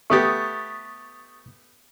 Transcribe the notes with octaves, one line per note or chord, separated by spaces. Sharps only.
A3 B3 G4 C#6 D#6 A6